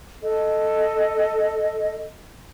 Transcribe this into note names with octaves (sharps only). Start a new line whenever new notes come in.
A4 D#5